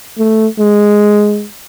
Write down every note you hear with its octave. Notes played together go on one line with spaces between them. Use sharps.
A3
G#3